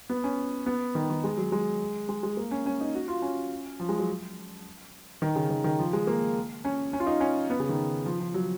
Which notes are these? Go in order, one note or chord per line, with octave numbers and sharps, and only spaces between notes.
B3
C#4
B3
D#3
D#3
G#3
F#3
G#3
G#3
G#3
A#3
C#4
C#4
D#4
F#4
F4
C#4
F3
G#3
F#3
D#3
C#3
D#3
D#3
F3
G#3
A#3
C#4
C#4
F4
D#4
C#4
B3
C#3
D#3
F3
F3
F#3